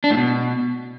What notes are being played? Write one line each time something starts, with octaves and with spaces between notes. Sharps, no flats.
D4
A2
B2